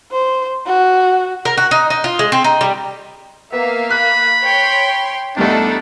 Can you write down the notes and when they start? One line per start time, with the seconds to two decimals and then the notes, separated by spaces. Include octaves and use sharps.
0.12 C5
0.66 F#4
1.45 A#4
1.57 F#4
1.71 D#4
1.90 D#4
2.04 F4
2.19 G#3
2.32 C4
2.44 D#4
2.61 G3
3.52 A#3 B3 E5 F5
3.90 B5 F#6
4.41 C#5 G5 C6
5.37 E2 G3 A3 D4 D#4 A4 F#5